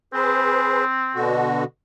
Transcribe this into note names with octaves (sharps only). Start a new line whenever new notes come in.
C4 G#4 B4 C5
B2 D3 F#4